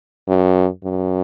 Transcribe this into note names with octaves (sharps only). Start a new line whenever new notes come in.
F#2
F#2